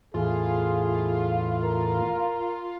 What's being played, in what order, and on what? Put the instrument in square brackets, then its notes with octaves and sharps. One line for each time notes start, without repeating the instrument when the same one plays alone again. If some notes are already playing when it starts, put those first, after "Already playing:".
[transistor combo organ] E2 A2 [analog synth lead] F4 [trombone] G#4
[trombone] A#4